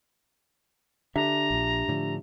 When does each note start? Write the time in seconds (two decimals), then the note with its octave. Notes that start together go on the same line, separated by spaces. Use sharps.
1.16 D3 D4 G4 E5 A#5
1.50 A#1 A#2
1.88 A2 D3 F3